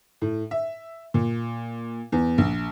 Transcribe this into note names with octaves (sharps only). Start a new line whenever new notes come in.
A2
E5
A#2
E2
A#1